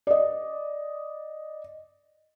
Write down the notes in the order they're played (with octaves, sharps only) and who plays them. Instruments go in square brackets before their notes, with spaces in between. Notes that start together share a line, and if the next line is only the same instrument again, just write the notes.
[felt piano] D5 D#5